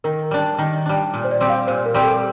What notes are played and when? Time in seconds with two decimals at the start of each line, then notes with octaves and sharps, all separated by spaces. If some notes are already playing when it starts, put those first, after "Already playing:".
0.04 D#3 A#4
0.31 G3 D4
0.58 D#3
0.86 G3 D4
1.14 A#2
1.24 C5
1.31 D5
1.41 G3 C4 G4
1.49 F5
1.67 A#2 C5
1.86 A#4
1.94 G3 C4 G4
2.03 A4